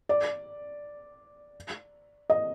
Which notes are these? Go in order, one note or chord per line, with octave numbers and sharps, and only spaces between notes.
D5
D#5